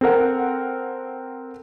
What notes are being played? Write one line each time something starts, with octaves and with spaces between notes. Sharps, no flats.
C4 A4 A#4 F#5